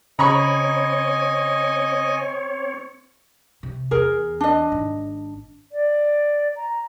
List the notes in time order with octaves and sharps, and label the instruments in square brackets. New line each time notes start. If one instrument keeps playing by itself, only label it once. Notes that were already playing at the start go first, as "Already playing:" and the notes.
[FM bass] C#3 [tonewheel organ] C4 C#5 [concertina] D#5 G#5 [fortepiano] A#5 B5 C#6
[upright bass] C3
[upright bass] E2 [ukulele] G#4 A#4
[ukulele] D4 D#5
[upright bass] G#1
[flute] D5
A#5